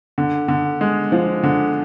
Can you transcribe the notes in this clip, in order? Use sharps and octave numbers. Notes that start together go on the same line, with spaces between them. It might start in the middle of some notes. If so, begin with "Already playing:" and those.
D3
D3
G#3
F3
D3